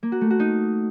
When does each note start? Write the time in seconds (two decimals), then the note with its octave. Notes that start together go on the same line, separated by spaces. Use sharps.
0.03 A#3
0.12 F#4
0.21 A3
0.30 F#4
0.40 D#4